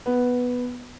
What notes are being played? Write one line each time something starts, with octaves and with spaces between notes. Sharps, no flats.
B3